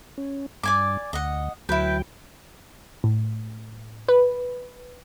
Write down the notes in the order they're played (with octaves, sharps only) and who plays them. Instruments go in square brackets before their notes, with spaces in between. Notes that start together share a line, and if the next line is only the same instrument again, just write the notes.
[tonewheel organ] C#4
[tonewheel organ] G2 [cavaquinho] D5 G#5 D6
[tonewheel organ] D2 [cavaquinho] D#5 F#5
[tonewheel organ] D2 F#3 G5 [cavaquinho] E4 B4
[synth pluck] A2
B4